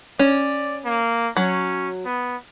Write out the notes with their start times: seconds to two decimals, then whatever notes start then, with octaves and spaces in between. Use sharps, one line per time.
0.19 C#4 D5
0.85 A#3
1.37 F#3 C#4
2.05 B3